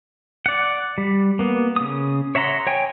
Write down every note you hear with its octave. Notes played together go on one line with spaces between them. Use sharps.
D5 F#5
G3
A#3 B3
C#3 D#6
C#5 E5 F#5 A#5 C6
C#5 G5 G#5